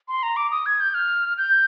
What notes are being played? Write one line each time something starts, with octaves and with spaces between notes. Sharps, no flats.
C6
A#5
D6
D#6
G#6
G6
F6
G6